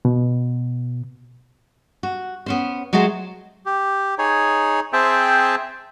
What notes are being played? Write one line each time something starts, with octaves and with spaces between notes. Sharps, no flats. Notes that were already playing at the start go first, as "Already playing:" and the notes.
B2
F#4
B3 C#4 C5
F#3 G#3 A3 F#4 C5
G4
D#4 G#4 C#5
C4 G#4 C5 E5 G5 A5